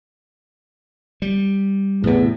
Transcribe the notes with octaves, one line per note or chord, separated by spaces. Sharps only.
G3
E2 A2 C3